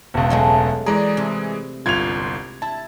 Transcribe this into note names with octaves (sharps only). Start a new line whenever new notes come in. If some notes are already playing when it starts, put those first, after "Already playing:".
E1 C#2
F#3 G#3 A3
E3 G#3 G#4 D5 A#5
C3
G1 C2 F4 G#6 F7
E4 A5